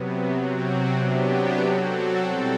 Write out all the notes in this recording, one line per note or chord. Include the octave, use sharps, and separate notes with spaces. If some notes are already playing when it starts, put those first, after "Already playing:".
Already playing: C3 F#3 B3
C3 F#3 C4 F#4
C3 F#3 B3 D4 G4
F#3 C4 F#4 A4
B2 G3 C4 E4 A4